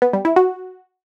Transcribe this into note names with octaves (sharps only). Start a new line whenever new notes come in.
B3
G3
E4
F#4